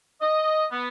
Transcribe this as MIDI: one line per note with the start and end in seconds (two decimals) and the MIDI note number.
0.21 0.64 75
0.70 0.88 59